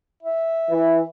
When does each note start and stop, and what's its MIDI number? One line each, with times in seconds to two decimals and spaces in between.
0.23 1.06 76
0.70 1.01 52